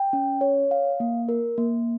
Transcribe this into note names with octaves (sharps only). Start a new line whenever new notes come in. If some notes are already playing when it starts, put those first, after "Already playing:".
Already playing: G5
C#4
C#5
F5
A#3
A#4
A#3